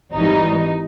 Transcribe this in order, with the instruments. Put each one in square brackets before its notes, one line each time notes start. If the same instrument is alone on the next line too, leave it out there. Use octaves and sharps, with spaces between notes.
[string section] G#1 G#2 E3 G3 D#4